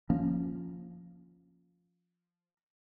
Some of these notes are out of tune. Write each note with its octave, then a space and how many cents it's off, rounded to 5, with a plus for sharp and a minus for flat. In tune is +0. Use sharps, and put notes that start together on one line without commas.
F3 +0 A#3 +0 C#4 +0